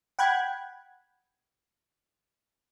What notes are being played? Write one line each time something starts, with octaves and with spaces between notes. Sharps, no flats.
F#5 G5 B5 F#6 G#6